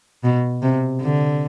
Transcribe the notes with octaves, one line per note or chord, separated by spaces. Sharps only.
B2
C3
D3